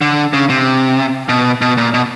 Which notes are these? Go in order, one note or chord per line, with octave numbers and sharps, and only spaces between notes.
D3
C#3
C3
B2
B2
A#2
B2